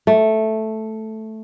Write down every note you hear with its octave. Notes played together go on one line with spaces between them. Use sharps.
A3